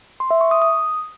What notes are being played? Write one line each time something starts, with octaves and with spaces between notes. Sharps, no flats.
C6
E5
C#6
D#6
D#6